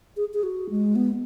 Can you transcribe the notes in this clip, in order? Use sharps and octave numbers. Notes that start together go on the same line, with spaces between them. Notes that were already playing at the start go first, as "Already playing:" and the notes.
G#4
G#4
F#4
G#3
B3